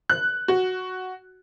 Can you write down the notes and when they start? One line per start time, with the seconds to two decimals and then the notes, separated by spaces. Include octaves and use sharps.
0.10 F#6
0.48 F#4